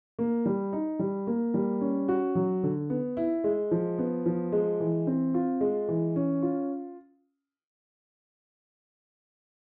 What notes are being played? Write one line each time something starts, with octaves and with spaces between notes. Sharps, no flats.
A#3
G3
D#4
G3
A#3
G3
C#4
F#4
F#3
D3
B3
E4
G#3
F3
B3
F3
G#3
E3
C4
F4
G#3
E3
C#4
F4